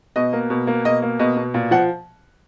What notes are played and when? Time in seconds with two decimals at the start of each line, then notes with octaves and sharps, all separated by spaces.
0.16 B2 D#5
0.33 A#3
0.50 B2
0.67 A#3
0.85 B2 D#5
1.02 A#3
1.19 B2 D#5
1.37 B2
1.54 A#2
1.71 F3 F#5